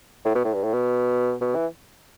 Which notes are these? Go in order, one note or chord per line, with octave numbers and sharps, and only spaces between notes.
A2
B2
A2
G2
A2
B2
B2
E3